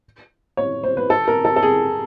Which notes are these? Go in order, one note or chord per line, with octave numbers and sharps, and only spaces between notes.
C#5
C5
B4
A4
A#4
A4
A4
G#4